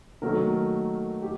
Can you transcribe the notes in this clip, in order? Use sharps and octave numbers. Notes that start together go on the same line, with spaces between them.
D#3 F#3 A3 A#3 A#4
G4